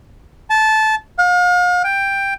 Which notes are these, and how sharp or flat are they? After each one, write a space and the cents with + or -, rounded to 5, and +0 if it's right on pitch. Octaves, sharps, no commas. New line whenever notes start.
A5 -15
F5 +40
G5 +10